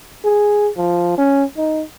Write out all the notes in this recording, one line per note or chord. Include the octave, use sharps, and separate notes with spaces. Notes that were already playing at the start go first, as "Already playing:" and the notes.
G#4
F3
C#4
D#4